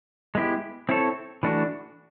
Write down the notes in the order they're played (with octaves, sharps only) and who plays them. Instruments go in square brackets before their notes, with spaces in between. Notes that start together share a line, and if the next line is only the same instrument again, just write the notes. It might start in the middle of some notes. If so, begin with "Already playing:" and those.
[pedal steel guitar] G#3 B3 E4 G4
C4 E4 A4 C#5
E3 A3 D4 F#4